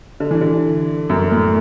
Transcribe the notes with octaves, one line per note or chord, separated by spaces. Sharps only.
D3
E3
D3
F#2
A2